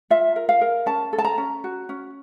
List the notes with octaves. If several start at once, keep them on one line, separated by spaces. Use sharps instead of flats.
F4 E5
A#4
F5
A#4
C#4 A5
A4
A5
A#5
C#4
F#4
C#4